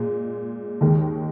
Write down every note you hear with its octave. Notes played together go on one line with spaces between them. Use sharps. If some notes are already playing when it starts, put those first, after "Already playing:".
Already playing: A#2 G#3
D#2 D#3 G#3